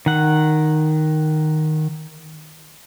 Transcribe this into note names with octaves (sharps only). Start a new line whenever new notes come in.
D#3 F#5